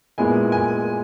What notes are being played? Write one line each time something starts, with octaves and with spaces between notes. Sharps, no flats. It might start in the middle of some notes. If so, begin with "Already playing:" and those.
A#2 G#3 B3 E4 G#5
G#5